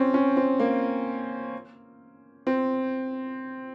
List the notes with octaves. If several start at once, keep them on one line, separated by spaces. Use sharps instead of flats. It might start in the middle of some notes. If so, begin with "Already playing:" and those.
Already playing: C4 C#4
C#4
C4
A#3
C4